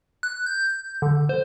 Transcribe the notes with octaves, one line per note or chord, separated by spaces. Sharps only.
F#6
G6
G6
D3
C5